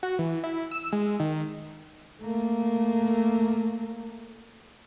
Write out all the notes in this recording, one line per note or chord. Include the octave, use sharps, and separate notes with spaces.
F#4
E3
E4
E6
G#3
D#3
A3 A#3